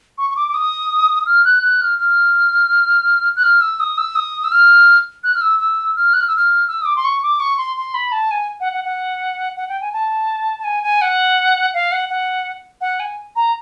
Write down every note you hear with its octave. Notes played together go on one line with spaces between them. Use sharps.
C#6
C#6
D6
D6
D#6
F6
F#6
F#6
F6
F6
F#6
F6
E6
D#6
E6
D#6
E6
F6
F#6
F6
E6
E6
F6
F#6
F6
E6
F6
E6
D#6
D6
C6
C#6
D6
C#6
C6
C6
B5
A5
G#5
F#5
F#5
F#5
F#5
G5
G#5
A5
A5
G#5
G#5
F#5
F5
F#5
F#5
F#5
G#5
A#5